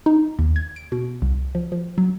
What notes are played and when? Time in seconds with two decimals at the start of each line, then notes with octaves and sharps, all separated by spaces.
0.06 D#4
0.39 D#2
0.56 G#6
0.76 D7
0.92 B2
1.22 C2
1.55 F3
1.72 F3
1.98 F#3